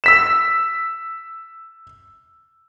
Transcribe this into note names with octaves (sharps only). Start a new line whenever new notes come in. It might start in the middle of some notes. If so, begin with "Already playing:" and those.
E6 B6 E7